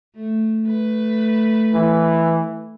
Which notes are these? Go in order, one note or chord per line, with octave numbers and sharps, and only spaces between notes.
A3
A3 B4
E3